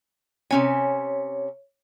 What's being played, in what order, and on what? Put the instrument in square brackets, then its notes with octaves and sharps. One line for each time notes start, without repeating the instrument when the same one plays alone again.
[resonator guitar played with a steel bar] C3 C#4 G#5 [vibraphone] C#5